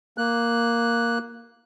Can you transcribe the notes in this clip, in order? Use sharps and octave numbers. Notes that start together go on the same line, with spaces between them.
A#3 F#6